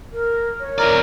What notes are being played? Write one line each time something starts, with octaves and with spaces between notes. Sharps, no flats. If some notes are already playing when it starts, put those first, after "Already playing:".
A#4
C#5
E4 A#4 D5